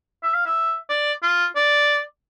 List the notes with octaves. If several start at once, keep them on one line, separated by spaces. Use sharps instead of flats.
E5
F5
E5
D5
F4
D5